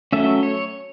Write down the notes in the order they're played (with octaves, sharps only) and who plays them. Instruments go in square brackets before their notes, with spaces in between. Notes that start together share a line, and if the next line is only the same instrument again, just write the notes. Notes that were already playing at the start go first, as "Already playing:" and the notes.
[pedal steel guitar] F#3 A3 C#4 E5
C#5